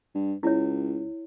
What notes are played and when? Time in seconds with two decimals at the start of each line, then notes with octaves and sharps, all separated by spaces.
0.15 G2
0.43 C#2 E4 C#5